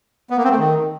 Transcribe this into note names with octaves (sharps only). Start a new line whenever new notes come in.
B3
A#3
C4
A3
D#3